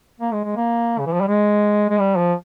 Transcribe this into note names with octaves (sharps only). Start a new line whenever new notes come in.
A#3
G#3
G#3
A#3
C#3
E3
F3
G3
G#3
G#3
G3
F3